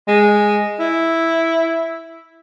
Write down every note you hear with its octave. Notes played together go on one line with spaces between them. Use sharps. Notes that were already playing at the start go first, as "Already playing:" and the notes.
G#3
E4